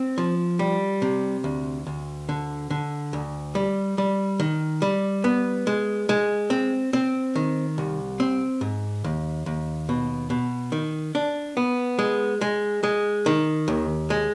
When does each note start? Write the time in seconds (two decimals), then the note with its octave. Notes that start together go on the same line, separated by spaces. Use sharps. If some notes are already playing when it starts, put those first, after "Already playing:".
Already playing: C4
0.18 F3
0.59 G3
1.02 C3
1.44 D2
1.87 D2
2.29 D3
2.71 D3
3.13 D2
3.55 G3
3.98 G3
4.40 D#3
4.82 G3
5.24 B3
5.67 G#3
6.09 G#3
6.50 C4
6.93 C4
7.35 D#3
7.78 C2
8.20 C4
8.61 G#2
9.04 D#2
9.46 D#2
9.89 B2
10.30 B2
10.72 D#3
11.15 D4
11.57 B3
11.99 G#3
12.41 G#3
12.83 G#3
13.26 D#3
13.68 D#2
14.10 G#3